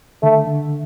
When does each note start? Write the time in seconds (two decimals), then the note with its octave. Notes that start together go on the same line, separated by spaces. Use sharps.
0.23 D3 A3
0.47 D3